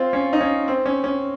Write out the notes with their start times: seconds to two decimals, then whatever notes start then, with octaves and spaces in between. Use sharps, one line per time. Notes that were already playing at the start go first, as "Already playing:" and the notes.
Already playing: C4 F4
0.13 C#4
0.33 D#4
0.41 C#4
0.68 C4
0.86 C#4
1.04 C#4